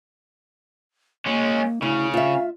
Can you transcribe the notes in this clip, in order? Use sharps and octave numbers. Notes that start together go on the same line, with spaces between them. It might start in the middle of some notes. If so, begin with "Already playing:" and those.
G#3 A#3 C#4
D2 C#3 E4
F4 E5 F5